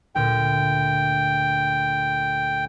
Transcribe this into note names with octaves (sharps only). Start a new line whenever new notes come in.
D2 A#2 G5